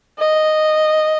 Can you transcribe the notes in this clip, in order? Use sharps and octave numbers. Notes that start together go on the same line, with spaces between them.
D#5